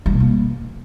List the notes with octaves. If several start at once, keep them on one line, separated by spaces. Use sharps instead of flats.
G3
B2
A#3